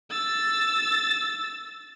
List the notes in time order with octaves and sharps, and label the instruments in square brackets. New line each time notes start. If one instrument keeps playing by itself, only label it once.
[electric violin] E6 A6